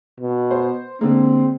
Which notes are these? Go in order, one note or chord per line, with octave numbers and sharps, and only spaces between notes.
B2
C5
D3 G#3 A#3 C4